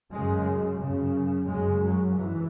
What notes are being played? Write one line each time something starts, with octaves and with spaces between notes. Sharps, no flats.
F#2 C#3 G#3
F#2 C#3
F#2 C#3 G#3
F#3
G#2 E3